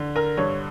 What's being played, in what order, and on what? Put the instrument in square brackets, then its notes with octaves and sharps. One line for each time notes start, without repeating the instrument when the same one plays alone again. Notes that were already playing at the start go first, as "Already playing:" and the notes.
Already playing: [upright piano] D3
A#4
G2 C#5